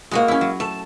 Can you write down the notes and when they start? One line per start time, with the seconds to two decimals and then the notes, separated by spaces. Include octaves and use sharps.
0.11 A2 G#3 A#3 F#4
0.28 C#4 E4
0.41 F#3
0.60 A3 A5